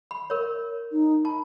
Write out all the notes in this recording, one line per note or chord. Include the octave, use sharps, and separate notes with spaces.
B5
A#4 C#5
D#4
A5 B5